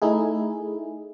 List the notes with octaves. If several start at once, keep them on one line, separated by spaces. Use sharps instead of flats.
A3 D#4 E4 G#4